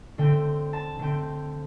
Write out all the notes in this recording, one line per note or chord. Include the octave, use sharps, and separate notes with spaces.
D3 A3 C4 G5
A5
D3 A3 C4 G5